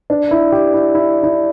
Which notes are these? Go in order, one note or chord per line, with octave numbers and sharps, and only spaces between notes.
D4
E4
G4
E4
E4
E4